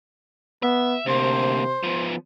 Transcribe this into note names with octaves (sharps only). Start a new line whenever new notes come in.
B3 E5
D2 C3 A#3 C5
F3 B3